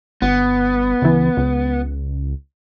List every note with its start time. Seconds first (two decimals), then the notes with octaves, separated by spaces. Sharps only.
0.22 G1 B3
1.02 C#2 E3
1.37 C#2